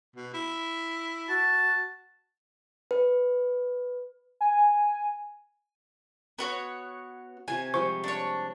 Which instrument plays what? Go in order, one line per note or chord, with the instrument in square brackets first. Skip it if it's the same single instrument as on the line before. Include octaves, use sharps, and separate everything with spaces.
[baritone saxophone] B2
E4
[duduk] F#4 [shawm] A5
[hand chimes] B4
[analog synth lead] G#5
[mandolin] B3 F#4 C#5
[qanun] C3 F4 C#6 [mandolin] G#5
[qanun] F3 G3 G#3 [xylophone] C5 [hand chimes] C#6
[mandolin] D4 C#5